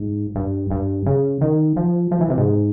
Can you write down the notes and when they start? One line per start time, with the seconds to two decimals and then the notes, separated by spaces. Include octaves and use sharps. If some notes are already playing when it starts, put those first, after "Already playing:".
Already playing: G#2
0.35 G2
0.71 G2
1.06 C#3
1.41 D#3
1.76 F3
2.11 F3
2.21 E3
2.30 C3
2.38 G#2